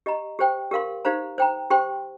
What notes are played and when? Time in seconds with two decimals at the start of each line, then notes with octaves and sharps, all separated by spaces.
0.06 G4 D#5 A#5
0.39 G4 C5 G5
0.71 G4 A#4 F5 C6
1.05 D#4 G4 C5 F5 A#5
1.38 C5 G5 A#5
1.70 G4 C5 G5 C6